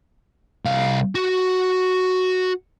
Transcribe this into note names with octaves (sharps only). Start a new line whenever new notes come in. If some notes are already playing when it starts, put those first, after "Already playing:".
C2 F5
F#4